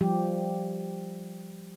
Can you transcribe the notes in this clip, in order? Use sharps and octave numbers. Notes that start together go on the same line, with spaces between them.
F3 G3 G4